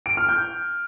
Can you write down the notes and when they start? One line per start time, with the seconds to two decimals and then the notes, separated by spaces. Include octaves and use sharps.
0.06 D7
0.17 F6
0.29 G6